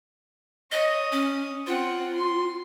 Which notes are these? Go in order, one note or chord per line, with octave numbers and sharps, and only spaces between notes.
C#5 D#5 D#6
C#4
C4 F4 F#5
C6